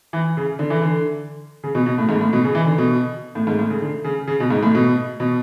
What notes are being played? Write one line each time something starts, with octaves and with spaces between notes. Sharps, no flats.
E3
C#3
D3
E3
D3
C#3
B2
B2
A2
G#2
A2
B2
C#3
E3
D3
B2
A2
G#2
A2
C#3
D3
C#3
C#3
B2
G#2
A2
B2
B2